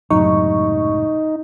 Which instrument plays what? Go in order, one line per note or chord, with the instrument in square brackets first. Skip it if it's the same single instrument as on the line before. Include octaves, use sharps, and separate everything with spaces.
[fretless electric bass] C#2 A2 C3 [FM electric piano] F#2 F#3 C#6 [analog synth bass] D#4